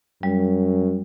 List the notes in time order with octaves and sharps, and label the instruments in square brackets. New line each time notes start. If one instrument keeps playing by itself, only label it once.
[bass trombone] F#2 [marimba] G3